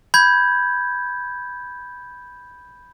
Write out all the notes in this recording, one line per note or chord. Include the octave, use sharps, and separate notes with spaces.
B5 G6 G#6